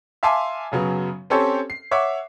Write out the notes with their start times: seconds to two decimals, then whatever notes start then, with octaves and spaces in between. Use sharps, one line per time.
0.23 E5 F5 G#5 A5 C6 D6
0.72 F#2 C#3 F#3 B3
1.30 C4 C#4 G4 A4 C5 C#5
1.70 C7
1.91 C#5 E5 F#5 D6